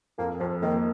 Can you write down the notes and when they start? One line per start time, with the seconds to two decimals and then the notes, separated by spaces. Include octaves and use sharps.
0.18 F2 A#3
0.40 F2 F3
0.62 D#3 A#3